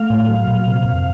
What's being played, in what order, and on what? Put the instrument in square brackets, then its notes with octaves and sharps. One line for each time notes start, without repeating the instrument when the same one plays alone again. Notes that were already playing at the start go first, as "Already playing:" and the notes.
Already playing: [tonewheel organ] A3 F5
A2
F#3
A#2
C3
F2